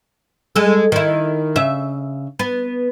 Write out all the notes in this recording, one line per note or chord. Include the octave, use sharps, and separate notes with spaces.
G#3 A4
D#3 E4
C#3 E5
B3